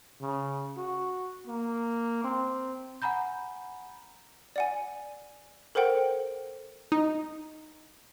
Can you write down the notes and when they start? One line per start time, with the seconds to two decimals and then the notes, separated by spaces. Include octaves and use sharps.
0.21 C#3
0.77 F#4
1.47 A#3
2.24 C4
3.02 F#5 G#5 A#5 B5 G6
4.56 D5 F#5 G#5
5.75 A4 A#4 C5 F#5 G5
6.92 D#4